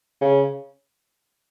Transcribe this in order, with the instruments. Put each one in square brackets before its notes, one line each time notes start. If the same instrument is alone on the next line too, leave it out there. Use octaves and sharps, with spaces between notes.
[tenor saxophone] C#3